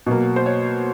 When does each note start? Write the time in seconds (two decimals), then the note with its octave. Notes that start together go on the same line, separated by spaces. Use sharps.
0.06 B2 F#3 A#3
0.36 C5
0.46 C#5